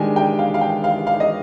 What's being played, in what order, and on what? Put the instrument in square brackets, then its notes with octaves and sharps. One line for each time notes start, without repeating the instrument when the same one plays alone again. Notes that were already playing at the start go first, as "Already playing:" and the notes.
Already playing: [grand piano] D#3 G#3 D4 G4 [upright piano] G#5
[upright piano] G5
F5
F5
G5
F5
F5
D#5